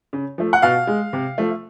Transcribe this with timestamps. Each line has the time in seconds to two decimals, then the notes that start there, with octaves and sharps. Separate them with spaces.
0.13 C#3
0.38 F3 A3
0.53 F#5
0.62 B2 F5
0.87 G#3
1.13 C3
1.38 F3 A3